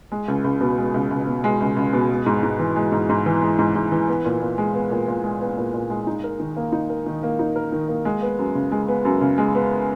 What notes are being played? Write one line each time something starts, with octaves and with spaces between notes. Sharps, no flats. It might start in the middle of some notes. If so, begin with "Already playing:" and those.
G#3
C#2
C#2
B2
G#3
C#2
C#2
B2
G#3
C#2
C#2
B2
G#3
G#2
G#2
E3
G#3
G#2
G#2
E3
G#3
G#2
G#2
E3
B3
A#2
A#2
G#3
B3
A#2
A#2
G#3
B3
A#2
A#2
G#3
D#4
A#4
D#3
A#3
D#4
A#4
D#3
A#3
D#4
A#4
D#3
A#3
G#3
B3
F#2
C#3
G#3
B3
F#2
C#3
G#3
B3